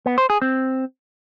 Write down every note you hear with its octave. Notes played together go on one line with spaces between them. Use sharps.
B3
C5
G#4
C4